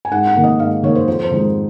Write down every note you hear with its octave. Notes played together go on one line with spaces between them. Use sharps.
G#5
G#2 F#5
F#5
D#3 A#3
D#5
G#2 F5
D#3 A#3 C#5
C5
F2 C5
C5
D#3 G#3 D#4